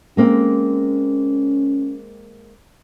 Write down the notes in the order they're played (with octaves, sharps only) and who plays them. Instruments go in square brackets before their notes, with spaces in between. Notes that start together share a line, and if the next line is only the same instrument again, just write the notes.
[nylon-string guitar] G#3 A#3 C4 [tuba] C#4